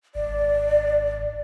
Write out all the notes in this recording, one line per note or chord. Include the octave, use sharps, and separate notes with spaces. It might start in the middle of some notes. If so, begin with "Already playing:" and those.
G#1 D5